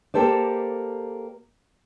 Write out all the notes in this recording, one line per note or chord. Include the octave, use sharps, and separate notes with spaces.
A#3 G4 A4 C5 D5